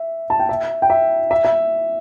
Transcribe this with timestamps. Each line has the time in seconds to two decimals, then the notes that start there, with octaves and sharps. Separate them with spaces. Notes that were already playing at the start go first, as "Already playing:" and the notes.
Already playing: E5
0.30 A5
0.39 G5
0.49 E5
0.82 G5
0.90 E5
1.31 E5
1.45 E5